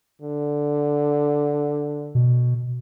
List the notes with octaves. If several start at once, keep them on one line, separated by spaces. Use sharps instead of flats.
D3
B2